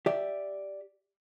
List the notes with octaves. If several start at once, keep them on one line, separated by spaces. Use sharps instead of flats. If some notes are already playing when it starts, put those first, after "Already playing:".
G4 D5 E5